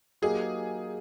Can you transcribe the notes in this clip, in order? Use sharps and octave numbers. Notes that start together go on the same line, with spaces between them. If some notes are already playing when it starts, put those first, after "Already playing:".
F#3 A#3 D#4 G4 G#4